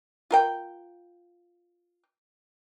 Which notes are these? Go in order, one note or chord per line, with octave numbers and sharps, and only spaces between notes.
F4 A#4 G5